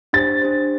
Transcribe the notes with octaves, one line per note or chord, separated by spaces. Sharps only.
D4 G4 C5 A6
D4 G4 C5